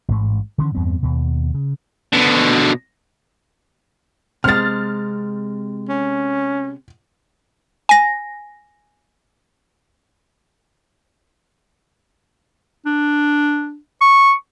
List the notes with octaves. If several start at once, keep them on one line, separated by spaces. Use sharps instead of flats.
A1 G#2 A3
D3 E3 C#4
E2 G2 B3 C4
D#2 B2
C#3
B2 D3
C3 G#3 F6 A6
C#4
G#5 A#6
D4
C#6